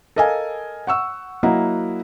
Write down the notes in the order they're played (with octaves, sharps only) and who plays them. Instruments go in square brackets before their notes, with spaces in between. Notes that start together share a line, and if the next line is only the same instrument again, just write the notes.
[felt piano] A4 A#4 D#5 F5 G#5
F#5 C#6 E6
F#3 A#3 E4 D#5 F#5